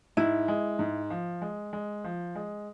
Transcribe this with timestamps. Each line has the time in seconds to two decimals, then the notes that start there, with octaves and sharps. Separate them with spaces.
0.17 G#2 E4
0.48 G#3
0.79 G#2
1.10 F3
1.42 G#3
1.73 G#3
2.04 F3
2.35 G#3